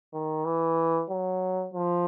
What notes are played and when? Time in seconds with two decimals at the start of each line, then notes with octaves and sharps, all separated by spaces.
0.13 D#3
0.45 E3
1.10 F#3
1.74 F3